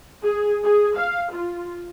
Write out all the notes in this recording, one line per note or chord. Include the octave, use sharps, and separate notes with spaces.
G#4
G#4
F5
F4